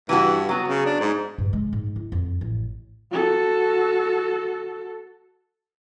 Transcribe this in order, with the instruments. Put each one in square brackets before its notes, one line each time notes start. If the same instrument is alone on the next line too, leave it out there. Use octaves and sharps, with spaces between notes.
[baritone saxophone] G2 [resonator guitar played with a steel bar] E3 F#4
[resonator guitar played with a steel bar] F#3 B3 F#4
[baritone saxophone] C#3
D4
G#2
[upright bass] G2
G#3
G#2
E4
F2
A1
[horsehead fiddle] F#4 A4